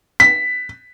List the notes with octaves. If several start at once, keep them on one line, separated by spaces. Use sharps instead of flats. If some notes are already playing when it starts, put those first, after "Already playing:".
B6